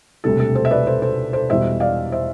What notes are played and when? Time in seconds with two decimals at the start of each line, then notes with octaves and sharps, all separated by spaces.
0.24 E1 D2 C3 G3 A4
0.40 A4
0.55 A4 C5
0.65 E5
0.71 B4 D5
0.87 A4 C5
1.02 A4 C5
1.33 A4 C5
1.49 E1 E2 B2 G3 C5 E5
1.80 D5 F5
2.12 C5 E5